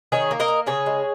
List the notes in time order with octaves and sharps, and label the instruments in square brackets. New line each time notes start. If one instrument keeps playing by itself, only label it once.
[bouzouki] D#3 G#4 C#5
A#3
A#4 D#5
A#3
C#3 G#4 C#5
G#3